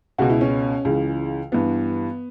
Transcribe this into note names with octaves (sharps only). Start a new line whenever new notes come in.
C#2 B2 F#4
E4
C#4
C#2 C#3 E3
G2 E3 B3